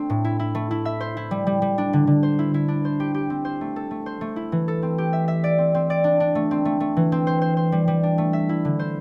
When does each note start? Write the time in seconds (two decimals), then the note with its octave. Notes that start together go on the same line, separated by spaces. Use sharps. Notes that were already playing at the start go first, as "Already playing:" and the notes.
Already playing: A3 C4 D4
0.10 A2
0.25 E4
0.39 E4
0.55 A3
0.71 E4
0.85 E5
1.00 C5
1.17 E4
1.31 G3
1.47 G3
1.62 G3
1.78 D4
1.93 D3
2.07 D3
2.23 C5
2.39 E4
2.54 E4
2.68 D4
2.85 C5
3.00 G4
3.14 G4
3.30 C4
3.45 C5
3.61 A3
3.76 A4
3.91 A3
4.06 C5
4.21 A3
4.36 E4
4.52 E3
4.68 A4
4.83 C4
4.98 G4
5.13 E5
5.28 E5
5.44 D5
5.58 C4
5.74 C4
5.90 D5
6.04 D4
6.20 D4
6.35 A3
6.51 C4
6.65 A3
6.80 A3
6.97 E3
7.12 C4
7.27 C5
7.42 C5
7.57 C5
7.72 G3
7.88 G3
8.03 D4
8.18 A3
8.33 E5
8.49 E4
8.65 D3
8.79 C5